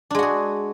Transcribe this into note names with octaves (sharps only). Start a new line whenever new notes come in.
G#3 D4 F#4 G#4